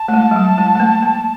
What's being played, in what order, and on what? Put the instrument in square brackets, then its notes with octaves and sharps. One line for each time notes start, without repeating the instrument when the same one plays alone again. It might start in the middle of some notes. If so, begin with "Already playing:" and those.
Already playing: [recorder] A5
[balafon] A3
G#3
F#3
G3
G#3
A3
A#3
A#3